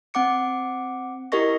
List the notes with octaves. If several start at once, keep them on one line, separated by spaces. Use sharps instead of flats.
C4 F#5 D6 C#7
E4 G4 A#4 D#5 C#6 A#6